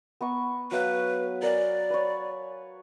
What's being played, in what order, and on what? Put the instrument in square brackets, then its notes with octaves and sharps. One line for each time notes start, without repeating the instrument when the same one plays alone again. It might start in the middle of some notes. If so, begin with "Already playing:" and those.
[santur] B3 A#5 C#6
[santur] F#3 F5 F#5 [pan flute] B4
[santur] A#4 G#5 [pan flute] D5
[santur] B4 C#5